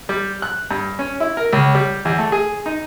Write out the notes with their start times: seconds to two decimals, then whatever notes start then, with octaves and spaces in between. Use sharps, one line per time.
0.09 G3
0.42 F#6
0.71 G2
0.99 C#4
1.20 E4
1.37 A#4
1.53 C#2
1.75 G3
2.05 E2
2.18 A3
2.32 G#4
2.66 D#4